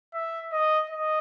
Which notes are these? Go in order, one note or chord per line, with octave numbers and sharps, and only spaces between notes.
E5
D#5
D#5